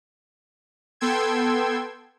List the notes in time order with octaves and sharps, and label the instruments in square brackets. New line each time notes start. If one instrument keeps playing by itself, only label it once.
[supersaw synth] B3 A4 G5 C6 E6 G#6